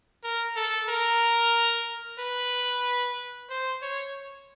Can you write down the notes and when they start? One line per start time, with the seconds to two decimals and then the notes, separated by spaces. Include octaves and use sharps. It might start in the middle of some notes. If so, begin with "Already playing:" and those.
0.24 A#4
0.56 A4
0.89 A#4
2.19 B4
3.50 C5
3.82 C#5